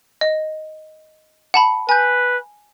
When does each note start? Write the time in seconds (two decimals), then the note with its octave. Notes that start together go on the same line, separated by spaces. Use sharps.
0.21 D#5
1.54 F#5 A5 B5
1.89 B4 G#5 G6